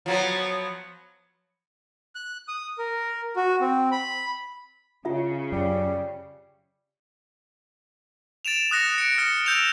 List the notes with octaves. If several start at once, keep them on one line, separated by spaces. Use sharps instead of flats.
F3 F#3 B3
F#6
D#6
A#4
F#4
C4
B5
C#3 F4 E5
F#2 G3
A6 D7 E7 F7
D#6 F#6 A#6 C#7
C#7 D7
F6 A#6 C#7
E6 F6 G6 D7 E7 F7